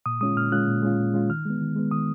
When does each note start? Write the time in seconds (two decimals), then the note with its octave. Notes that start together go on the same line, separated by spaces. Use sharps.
0.06 A#2 D#6
0.21 G#3 C#4 F4 D#6
0.36 A#2 F6
0.52 G#3 C#4 F4 F#6
0.68 A#2
0.83 G#3 C#4 F4
0.98 A#2
1.14 G#3 C#4 F4
1.30 D#3 F6
1.45 G#3 B3
1.61 D#3
1.76 G#3 B3
1.91 D#3 D#6